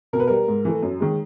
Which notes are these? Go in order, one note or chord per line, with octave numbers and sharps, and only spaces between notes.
B2 A#4
B4
G3 A#4
G#2
E3 A3
F#2
D#3 G#3